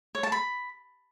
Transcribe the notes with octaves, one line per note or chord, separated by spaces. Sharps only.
C#5
A5
B5